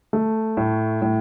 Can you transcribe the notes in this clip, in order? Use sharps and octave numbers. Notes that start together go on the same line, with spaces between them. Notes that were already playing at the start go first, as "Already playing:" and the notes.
A3
A2
A2